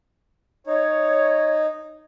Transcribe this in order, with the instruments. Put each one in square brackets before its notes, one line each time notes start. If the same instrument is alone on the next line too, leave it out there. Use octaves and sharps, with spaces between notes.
[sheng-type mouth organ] D#4 [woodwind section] C#5